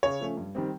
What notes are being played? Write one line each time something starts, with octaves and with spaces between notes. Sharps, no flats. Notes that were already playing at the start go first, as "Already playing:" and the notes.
C#3 C#5
F3 A3 C#4
G2
D#3 G3 C4